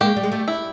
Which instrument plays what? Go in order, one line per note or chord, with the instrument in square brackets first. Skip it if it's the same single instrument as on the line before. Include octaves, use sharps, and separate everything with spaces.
[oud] G#3 A#3 [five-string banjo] G4
[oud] G3
G#3
G3 A3
[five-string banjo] E4